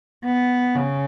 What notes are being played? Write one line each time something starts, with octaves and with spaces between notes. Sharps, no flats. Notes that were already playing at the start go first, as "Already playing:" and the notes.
B3
C#3